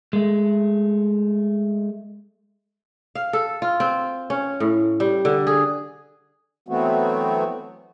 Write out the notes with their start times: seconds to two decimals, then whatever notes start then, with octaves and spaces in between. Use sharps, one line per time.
0.13 G#3 A3
3.15 F5
3.33 A4
3.62 F4
3.80 C4
4.30 C#4
4.60 A2
5.00 G3
5.25 D3
5.47 G#4
6.69 E3 F#3 A3 B3 C4 F#4